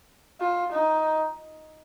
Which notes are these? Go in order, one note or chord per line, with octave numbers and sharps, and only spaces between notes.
F4
D#4